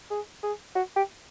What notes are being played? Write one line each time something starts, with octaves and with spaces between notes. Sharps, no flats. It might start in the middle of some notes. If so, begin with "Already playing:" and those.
G#4
G#4
F#4
G4